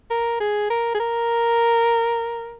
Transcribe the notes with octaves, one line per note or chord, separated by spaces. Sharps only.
A#4
G#4
A#4
G#4
A#4